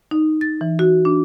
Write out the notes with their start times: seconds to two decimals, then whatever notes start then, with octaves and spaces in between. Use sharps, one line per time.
0.11 D#4
0.41 A6
0.61 E3
0.79 F#4
1.05 D4